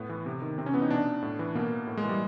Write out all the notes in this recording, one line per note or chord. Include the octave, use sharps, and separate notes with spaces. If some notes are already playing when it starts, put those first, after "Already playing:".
Already playing: A2 B3
E3
C3
D#3
C3 C4
C#4
E3 B3
D#4
B2 D4
A2
E3
B2 A#3
A2
G#3
E3
G3